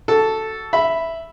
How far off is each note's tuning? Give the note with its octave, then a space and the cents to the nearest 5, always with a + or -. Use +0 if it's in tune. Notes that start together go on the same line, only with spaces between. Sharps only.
F#4 +25 A4 +0 A5 +0
E5 +0 B5 +0